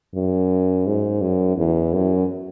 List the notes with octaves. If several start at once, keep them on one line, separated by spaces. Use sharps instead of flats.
F#2
G#2
F#2
E2
F#2